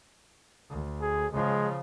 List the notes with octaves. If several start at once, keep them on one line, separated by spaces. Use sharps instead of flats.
D2
G#4
C#3 F3 G#3